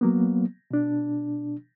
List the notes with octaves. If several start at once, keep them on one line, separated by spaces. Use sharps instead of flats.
F#3 A#3 B3
B2 D4